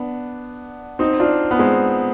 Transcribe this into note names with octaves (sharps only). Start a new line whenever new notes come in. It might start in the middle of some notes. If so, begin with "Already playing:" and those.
Already playing: B3 D4
C4 D#4
D4 F4
B3
G#3 C4